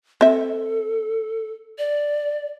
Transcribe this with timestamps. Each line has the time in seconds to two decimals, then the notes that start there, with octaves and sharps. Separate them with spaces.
0.21 C4 A4 E5
1.78 D5